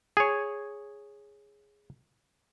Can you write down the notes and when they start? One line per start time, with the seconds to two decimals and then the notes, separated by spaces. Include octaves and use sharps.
0.17 G#4 C#5